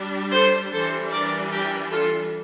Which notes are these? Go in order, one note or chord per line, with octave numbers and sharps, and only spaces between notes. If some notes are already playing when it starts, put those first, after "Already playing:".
Already playing: G3 D4
A4 C5
E3 G3 D4 A4 C5
A#4 D5
G4 A#4
F4 A4